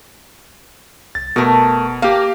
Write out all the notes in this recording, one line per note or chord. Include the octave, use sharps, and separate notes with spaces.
C2 A6
F1 B2 A3 A#4
A#3 G4 F5